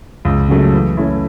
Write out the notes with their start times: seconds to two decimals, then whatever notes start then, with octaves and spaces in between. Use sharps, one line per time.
0.25 C#2
0.48 C#3 F#3 A3
0.73 E3
0.97 A3 C#4 E4